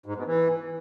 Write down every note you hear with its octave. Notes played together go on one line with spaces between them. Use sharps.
G#2
B2
E3